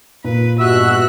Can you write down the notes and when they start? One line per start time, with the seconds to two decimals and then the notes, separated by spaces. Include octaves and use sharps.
0.24 A#2 B4
0.59 G2 B2 F#4 E5 E6 F#6